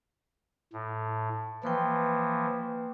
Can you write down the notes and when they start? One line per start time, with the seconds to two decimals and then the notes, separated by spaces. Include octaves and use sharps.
0.73 A2
1.63 E3 F3 A#3 B4 G5